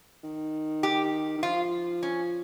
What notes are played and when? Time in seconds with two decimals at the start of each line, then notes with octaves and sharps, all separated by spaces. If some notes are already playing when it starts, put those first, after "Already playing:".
0.23 D#3
0.83 G4
1.38 D#3
1.43 F3 F4
2.03 C#4